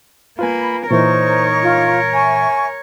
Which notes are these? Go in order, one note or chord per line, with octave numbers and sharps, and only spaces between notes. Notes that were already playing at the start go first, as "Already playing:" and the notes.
A#3 F4 B4 G#5 B5
A#2 E3 D#4 A#4 C5 C#5 C#6
F4
E5 G#5 C#6